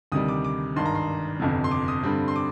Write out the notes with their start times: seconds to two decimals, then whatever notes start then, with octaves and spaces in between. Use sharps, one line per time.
0.12 D2 C3 D#3 G3 D#6
0.28 D6
0.44 D6
0.76 G#1 G2 D#3 C6
0.86 A#5
0.95 C6
1.40 G1 F2 C3
1.64 C6
1.71 D6
1.88 D#6
2.03 G2 D3 G3 C4
2.28 C6
2.36 D6